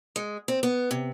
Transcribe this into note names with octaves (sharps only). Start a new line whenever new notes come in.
G#3
C4
B3
C3